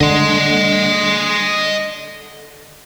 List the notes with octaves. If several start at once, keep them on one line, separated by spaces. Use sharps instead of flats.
D3 D#5 C6